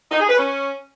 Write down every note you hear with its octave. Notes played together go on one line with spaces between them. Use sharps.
D#4
G#4
B4
C#4